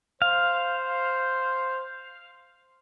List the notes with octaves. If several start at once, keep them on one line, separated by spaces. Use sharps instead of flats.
C5 F5